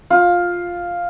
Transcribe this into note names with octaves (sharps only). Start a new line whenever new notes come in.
F4